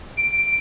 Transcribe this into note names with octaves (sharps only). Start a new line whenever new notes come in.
D7